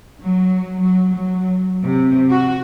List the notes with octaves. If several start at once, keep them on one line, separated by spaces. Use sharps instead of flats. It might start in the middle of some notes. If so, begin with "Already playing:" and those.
F#3
F#3
F#3
C3
F#4